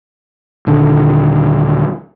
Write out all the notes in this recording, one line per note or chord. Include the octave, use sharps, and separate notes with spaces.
D#1 D3